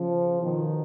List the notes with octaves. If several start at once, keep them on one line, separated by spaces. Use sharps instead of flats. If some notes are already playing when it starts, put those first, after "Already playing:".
Already playing: C#3 F3
B2 D#3